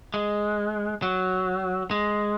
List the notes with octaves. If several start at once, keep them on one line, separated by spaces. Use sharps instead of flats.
G#3
F#3
G#3